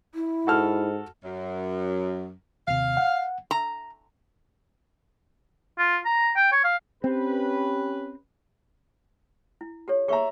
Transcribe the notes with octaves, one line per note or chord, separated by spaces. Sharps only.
E4
G#2 F#4 A4 F6
F#2
D#2 C3 F5
F#5
A#5
F4
A#5
G5
C#5
F5
C4 C#4 G4 B4
E4
G4 A4 C#5
G#4 C#5 E5 A#5 C#6